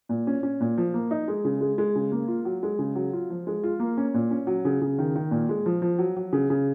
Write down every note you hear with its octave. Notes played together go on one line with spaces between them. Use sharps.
A#2
C#4
C#4
A#2
F3
A#3
D#4
G#3
C#3
G#3
G#3
C#3
A#3
F4
F#3
G#3
C#3
F#3
F4
F3
G#3
F4
A#3
C#4
A#2
C#4
F#3
C#3
C#3
D#3
D#3
A#2
G#3
F3
F3
F#3
F#3
C#3
C#3